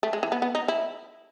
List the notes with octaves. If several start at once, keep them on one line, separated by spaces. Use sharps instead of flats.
A3
G#3
E3
B3
B3
D#4
E4